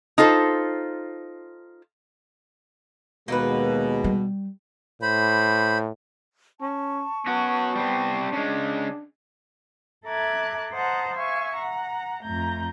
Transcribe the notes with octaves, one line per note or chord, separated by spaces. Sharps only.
D#4 F4 A4 C5
D#2 B2 G#3 A#3 D#4 B4
G3
A2 C5 B5
C#4 A5 C#6
B3 C#4 F#4
G3 C4
C#3 G#3 D4
A4 E5 A#5 D6 F#6 G#6
C5 D#5 F#5 A5 A#5
E5 F5 G#5 C#6
F#5 A#5
F2 A3 A#5 G6